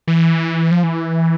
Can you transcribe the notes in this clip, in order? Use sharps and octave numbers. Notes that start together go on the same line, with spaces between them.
E3
F3
E3